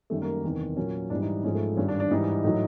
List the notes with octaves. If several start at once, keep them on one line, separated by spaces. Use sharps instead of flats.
F#2 D#3 G3 A3
A#3
E2 C3 D#3
A#2 F#3 C#4
G#2 E3 G3 D4
D#4
G#2 F3 G#3 C#4
A3
G2 D#3 G3 C#4
D4
D4
G#2 E3 G3 D#4
A2 F#3 D#4